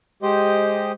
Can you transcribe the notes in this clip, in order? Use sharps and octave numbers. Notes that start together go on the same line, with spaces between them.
G#3 G4 C5 D#5